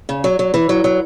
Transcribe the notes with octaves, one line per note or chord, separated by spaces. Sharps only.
C#3
F#3
F#3
E3
F#3
F#3